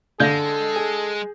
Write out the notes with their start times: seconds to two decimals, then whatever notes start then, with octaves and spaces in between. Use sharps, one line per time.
0.20 D3 G#3 A4 F5 G6 A#6
0.76 G#4